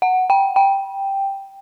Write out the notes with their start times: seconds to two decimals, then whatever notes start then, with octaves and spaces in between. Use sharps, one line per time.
0.02 F#5
0.30 G5
0.56 G5